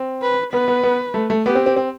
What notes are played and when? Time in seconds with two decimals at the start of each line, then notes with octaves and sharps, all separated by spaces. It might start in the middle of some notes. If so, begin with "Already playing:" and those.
Already playing: C4
0.22 B4
0.53 B3 B4
0.68 B3
0.83 B3
1.14 A3
1.30 A3
1.45 B3 G4
1.55 C4
1.66 C4
1.76 C4